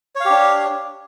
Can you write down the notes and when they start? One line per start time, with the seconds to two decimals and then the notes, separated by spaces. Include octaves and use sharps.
0.16 C#5
0.20 F5
0.25 G4
0.30 D4